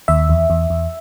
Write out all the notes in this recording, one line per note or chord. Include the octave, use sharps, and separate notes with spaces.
D#2 E5
E2
E2
E2